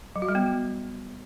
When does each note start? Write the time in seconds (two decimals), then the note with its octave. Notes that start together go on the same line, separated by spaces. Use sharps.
0.16 F#3
0.22 F#4
0.29 G3
0.35 B3